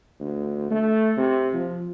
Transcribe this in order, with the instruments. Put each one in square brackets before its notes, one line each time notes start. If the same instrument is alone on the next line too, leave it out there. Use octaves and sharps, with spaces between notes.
[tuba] D2
A3
C3
F3